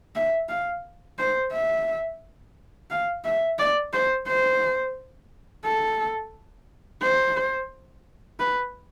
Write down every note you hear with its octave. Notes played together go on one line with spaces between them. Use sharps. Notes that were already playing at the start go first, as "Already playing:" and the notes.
E5
F5
C5
E5
F5
E5
D5
C5
C5
A4
C5
B4